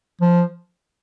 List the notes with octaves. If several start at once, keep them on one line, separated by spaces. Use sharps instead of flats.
F3